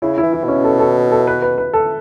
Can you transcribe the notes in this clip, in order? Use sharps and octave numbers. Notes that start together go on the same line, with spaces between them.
C#3 E4
E4
E3
E4
B2 C#4
A4
A4
A4
B4
B4
B4
A4